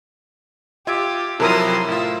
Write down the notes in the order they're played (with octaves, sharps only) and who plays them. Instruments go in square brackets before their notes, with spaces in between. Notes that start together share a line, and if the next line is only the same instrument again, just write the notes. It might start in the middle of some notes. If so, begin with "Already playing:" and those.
[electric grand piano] F4 G#6 D7 [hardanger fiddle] G4 [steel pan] E5
[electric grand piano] C3 F3 F#3 [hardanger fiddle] E4 C6 [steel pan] A4 A#4 D#6
[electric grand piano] A2 F4 [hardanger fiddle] E5